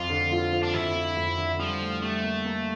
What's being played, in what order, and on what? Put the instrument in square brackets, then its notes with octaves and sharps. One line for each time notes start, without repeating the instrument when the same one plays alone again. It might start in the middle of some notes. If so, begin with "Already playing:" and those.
Already playing: [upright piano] F2 [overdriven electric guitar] F4
[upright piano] D3
F3
F3
[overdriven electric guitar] D4
[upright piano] F2 [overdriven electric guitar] E4
[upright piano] F3
F2
D3
[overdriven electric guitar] F3 [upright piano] G3
[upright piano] A2
[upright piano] G3 [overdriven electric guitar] A3
[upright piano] A#3
A#3